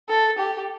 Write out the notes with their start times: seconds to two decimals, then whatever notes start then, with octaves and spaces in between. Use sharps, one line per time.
0.09 A4
0.38 G4